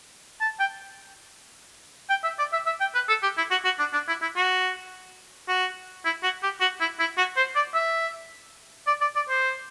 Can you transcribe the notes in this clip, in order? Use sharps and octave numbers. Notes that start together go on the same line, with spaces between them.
A5
G5
G5
E5
D5
E5
E5
G5
B4
A4
G4
E4
F#4
F#4
D4
D4
E4
E4
F#4
F#4
E4
F#4
G4
F#4
E4
E4
F#4
C5
D5
E5
D5
D5
D5
C5